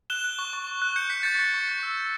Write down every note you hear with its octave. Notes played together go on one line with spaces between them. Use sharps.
F#6 E7 G7
F#6
C#6
C#6
C#6
F#6
G6 C#7
C#6 B6
G6 A6 C#7
C#6
C#6
G6
E6
G6